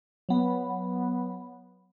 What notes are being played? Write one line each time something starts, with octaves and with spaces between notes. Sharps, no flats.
F#3 B3